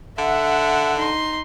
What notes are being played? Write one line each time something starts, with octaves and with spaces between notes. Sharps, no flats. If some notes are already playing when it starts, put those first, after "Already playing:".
D3 E5 F#5
D#4 C6